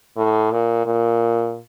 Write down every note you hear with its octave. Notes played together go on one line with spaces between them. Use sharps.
A2
A#2
A#2